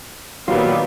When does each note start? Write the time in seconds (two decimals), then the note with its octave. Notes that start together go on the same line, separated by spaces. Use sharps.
0.48 A#2 D#3 F#3 G3 B3 F4